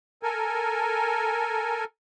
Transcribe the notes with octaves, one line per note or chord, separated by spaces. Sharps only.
A4 A#4 G#5